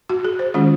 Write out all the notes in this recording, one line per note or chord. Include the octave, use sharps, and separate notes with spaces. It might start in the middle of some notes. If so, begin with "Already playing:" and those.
F#4
G#4
C5
D#3 G#3 C#4 F4